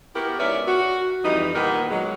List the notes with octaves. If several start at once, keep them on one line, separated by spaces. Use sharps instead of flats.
B3 E4 F#4 G4 A#4
G#2 B3 C#4 A#4 D5 E5
F#4
F2 E3 G3 D#4
A#2 D#3 B3 G4 A#4
F#3 G#3